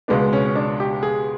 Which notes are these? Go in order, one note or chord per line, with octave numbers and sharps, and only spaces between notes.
C#2 B2 G#3 B3 D4
C#4
C#4
D4
G4
G#4